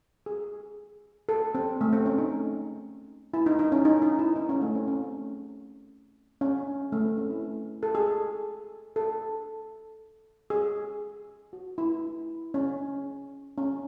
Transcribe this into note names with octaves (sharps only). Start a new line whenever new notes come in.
G#4
A4
C4
A3
C4
C#4
D#4
E4
D#4
D#4
C#4
D#4
D#4
E4
D#4
C#4
A3
C4
C#4
C#4
A3
C4
C#4
E4
A4
G#4
A4
G#4
F#4
E4
C#4
C#4